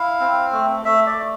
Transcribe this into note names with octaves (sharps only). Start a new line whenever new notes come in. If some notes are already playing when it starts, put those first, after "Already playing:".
Already playing: E4 F5
C4
A3
A3 E5
D5
A3